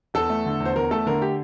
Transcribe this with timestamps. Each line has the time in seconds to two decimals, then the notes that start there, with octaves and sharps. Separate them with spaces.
0.14 E2 A4
0.30 A3
0.46 D3
0.60 E2
0.65 C5
0.76 E2 A#4
0.91 A3 A4
1.06 D3 A#4
1.22 G4